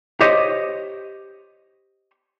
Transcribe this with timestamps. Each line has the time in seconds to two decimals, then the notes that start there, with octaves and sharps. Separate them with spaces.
0.20 G4 C5 C#5 D#5